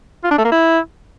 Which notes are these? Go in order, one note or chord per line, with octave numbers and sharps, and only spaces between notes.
F4
D4
A3
A#3
E4